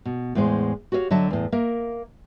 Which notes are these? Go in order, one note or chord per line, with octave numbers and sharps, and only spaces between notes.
B2
E2 A2 G#3 C5
F#4 G4 C#5 D#5 F5
D3 F#3 D#5 E5 A5
E2 A2
A#3 A#4 E5